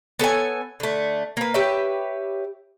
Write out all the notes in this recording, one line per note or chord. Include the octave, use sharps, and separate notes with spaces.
B3 A4 C#5 G#5
D3 A3
A#3 B4
G4 B4 C#5 E5